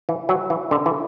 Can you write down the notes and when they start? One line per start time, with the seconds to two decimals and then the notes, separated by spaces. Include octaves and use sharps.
0.09 E3
0.29 F#3
0.50 E3
0.71 D3
0.86 E3